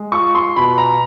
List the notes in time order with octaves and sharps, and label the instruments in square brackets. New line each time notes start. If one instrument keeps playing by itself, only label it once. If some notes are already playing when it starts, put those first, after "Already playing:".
Already playing: [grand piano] G#3
F4 C#6
C6
B2 B5
A#5